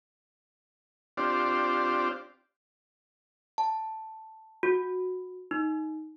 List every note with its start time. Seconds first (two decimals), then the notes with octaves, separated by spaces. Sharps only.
1.17 C4 D4 F4 G4 C5 D5
3.58 A5
4.63 F#4
5.51 D#4